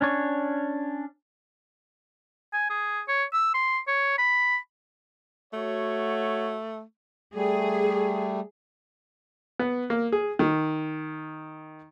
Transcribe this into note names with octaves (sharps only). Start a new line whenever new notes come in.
C#4 D4 C#5
G#5
G#4
C#5
E6
C6
C#5
B5
A3 F#4 C#5
G3 A3 G#4
B3
A#3
G#4
D#3